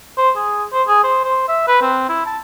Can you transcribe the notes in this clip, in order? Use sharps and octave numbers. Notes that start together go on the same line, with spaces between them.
C5
G#4
C5
G#4
C5
C5
E5
B4
C4
E4
A5